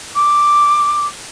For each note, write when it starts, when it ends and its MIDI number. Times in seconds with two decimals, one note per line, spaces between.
0.15 1.06 86